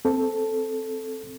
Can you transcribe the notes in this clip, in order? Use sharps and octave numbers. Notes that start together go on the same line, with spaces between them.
C4 A4